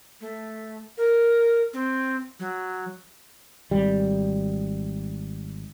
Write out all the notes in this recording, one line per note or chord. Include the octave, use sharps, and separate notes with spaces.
A3
A#4
C4
F#3
G#1 G3